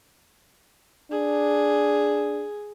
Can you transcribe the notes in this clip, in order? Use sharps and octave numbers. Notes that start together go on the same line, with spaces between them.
D4 G#4